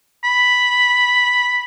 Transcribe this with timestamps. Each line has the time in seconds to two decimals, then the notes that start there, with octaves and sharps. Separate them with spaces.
0.24 B5